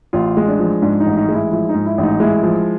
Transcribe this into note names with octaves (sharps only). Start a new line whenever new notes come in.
A1 F4
G#3
D4
F3
G#2 D4
D#4
A1
D#4
G#3
E4
F3 E4
D#4
G#2
E4
A1
D#4
G#3 E4
F3